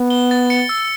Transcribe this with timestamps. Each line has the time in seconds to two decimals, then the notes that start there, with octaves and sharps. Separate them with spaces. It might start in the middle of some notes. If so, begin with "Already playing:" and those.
Already playing: B3
0.10 G7
0.31 A6
0.50 C#7
0.69 E6